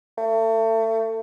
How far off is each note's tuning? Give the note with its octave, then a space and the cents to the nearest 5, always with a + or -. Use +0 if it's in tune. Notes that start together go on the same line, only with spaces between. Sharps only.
A3 +30